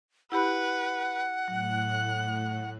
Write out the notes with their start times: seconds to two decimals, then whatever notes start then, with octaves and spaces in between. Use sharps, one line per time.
0.32 E4 G4 B4 F#5 B5
1.48 A2 F#3 F#6